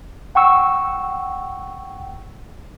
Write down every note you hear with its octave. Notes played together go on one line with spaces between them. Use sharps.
F#5 G5 C#6 E6